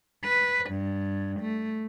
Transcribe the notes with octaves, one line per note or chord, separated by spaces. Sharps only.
B4
G2
A3